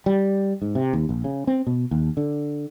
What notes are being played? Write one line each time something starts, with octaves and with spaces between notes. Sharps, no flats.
G3
G#2
C3
D#2
A#1
C#3
C4
B2
D#2
D3